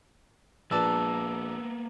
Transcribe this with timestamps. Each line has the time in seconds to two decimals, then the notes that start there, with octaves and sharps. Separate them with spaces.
0.71 A#1 A#3 B3 B4 D5 A5 E6